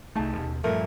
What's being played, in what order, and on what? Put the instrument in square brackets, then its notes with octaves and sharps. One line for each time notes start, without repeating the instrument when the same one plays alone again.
[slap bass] C2 A3 [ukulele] D#4 G#4 A5
[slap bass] D#2 B2
[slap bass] G2 A#2 F3 [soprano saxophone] A3 [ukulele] A#4